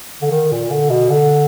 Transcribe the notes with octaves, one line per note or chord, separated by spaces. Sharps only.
D3
D#3
A#2
D3
B2
D3